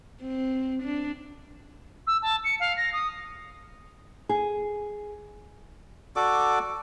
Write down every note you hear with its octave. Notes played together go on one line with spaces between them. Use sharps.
C4
D4
E6
A5
C#7
F5
A#6
D#6
G#4
F#4 A4 D5 D6